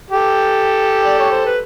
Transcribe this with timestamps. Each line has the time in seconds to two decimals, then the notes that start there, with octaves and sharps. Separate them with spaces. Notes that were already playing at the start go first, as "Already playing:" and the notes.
0.11 G4 A4
1.05 D5
1.19 C#5
1.31 C5
1.45 B4